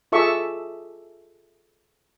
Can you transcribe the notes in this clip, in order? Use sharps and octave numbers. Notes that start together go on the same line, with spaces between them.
F4 G#4 A4 E5 C#6 D6